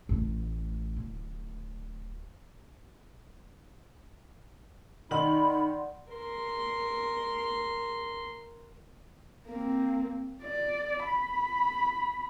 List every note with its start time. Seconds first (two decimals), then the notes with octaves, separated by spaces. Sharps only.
0.09 A1 A2
0.96 D1
5.11 D#3 D#4 D5 F#5 B5 C6 F#7
6.12 A#4 C6
9.47 A#3 C4
10.43 D5
11.05 B5